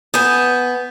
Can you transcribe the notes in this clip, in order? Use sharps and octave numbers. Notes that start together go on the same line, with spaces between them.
B3 G#5 D#6 G6 E7